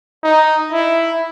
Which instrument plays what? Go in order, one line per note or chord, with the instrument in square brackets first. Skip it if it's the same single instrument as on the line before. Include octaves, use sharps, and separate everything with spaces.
[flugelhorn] D#4
E4